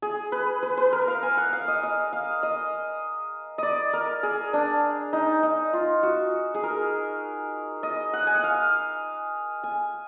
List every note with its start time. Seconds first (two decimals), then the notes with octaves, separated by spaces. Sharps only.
0.02 G#4
0.32 B4
0.63 B4
0.77 B4
0.93 A#4
1.08 F5
1.23 G#5
1.37 F#5
1.53 F5
1.68 D#5
1.83 D#5
2.13 F5
2.43 D#5
3.58 D5 D#5
3.93 A#4
4.23 G#4
4.53 D4
5.13 D#4
5.43 D#4
5.73 F4
6.03 F#4
6.54 G#4
6.63 A#4
7.83 D#5
8.13 F#5
8.27 G#5
8.35 F#5
8.44 F5
9.63 G#5